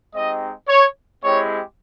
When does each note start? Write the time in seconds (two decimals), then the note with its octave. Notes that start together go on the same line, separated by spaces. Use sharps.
0.14 G#3 C4 D#4 G4 D#5
0.68 C#5
1.23 G#3 C4 E4 G4 C#5